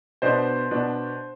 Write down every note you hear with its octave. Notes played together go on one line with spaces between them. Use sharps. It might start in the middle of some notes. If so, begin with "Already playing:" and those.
B2 B3 D4 C5
B2 B3 D4